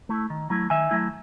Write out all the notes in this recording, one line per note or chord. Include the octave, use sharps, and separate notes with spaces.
A3 E4
D#3
F#3 A3 E4
D#3 E5 G#5
F#3 A3 E4